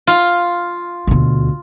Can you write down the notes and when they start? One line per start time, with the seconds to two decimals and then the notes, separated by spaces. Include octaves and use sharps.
0.07 F4
1.07 D2 B2